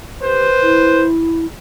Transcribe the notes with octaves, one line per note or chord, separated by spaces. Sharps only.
G4 B4 C5
E4